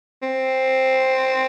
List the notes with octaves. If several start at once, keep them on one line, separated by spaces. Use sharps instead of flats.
C4